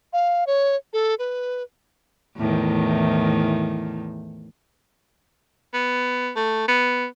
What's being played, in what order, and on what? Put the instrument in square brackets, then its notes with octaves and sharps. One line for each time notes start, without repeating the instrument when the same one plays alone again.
[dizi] F5
C#5
A4
B4
[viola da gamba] E2 A2 D#3
[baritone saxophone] B3
A3
B3